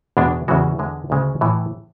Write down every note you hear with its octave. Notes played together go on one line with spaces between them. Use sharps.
E2 B2 G#3 D4
E2 C#3 E3 G#3 F#4
E2 D3 G#3
D2 C#3 G#3
A2 E3